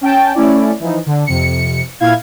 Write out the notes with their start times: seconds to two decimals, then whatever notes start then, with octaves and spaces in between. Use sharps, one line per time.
0.01 C#4 G5 A5
0.34 A3 C#4 E4 D5
0.80 E3 F3 D#4
1.06 D3
1.26 F2 C3 C#7
2.00 A#2 E4 F5 G#6